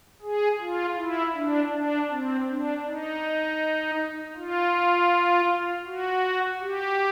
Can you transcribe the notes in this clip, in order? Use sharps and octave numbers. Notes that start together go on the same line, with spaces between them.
G#4
F4
E4
D4
D4
C4
D4
D#4
F4
F#4
G4